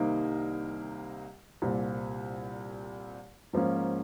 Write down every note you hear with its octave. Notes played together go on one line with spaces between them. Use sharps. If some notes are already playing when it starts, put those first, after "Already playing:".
Already playing: C2 C3 D#3 A#3 D#4
C2 A#2 G3 C4
G#2 F3 A#3 C#4